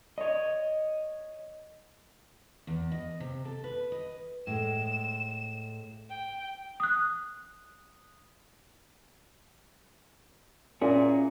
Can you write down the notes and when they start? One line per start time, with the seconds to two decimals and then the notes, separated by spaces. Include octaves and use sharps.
0.18 C#5 D#5
2.67 E2
2.92 D#5
3.20 C3
3.45 A4
3.64 B4
3.92 D#5
4.47 A2 G#3 E7
6.09 G5
6.80 D#6 F#6
10.82 A#2 C#4 E4 G#4